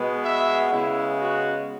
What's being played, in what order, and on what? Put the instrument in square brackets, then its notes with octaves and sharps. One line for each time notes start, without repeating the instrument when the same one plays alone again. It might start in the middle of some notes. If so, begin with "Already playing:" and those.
Already playing: [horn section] B2 G#3 B3
E5
C#3 G#3 B3 E4
F#4